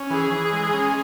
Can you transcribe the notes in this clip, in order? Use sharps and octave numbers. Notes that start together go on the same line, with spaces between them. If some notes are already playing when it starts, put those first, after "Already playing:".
Already playing: C#4
E3 G#4
E3
G#3
C#4